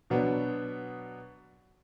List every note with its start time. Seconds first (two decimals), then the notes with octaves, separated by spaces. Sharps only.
0.10 B2 F#3 B3 D4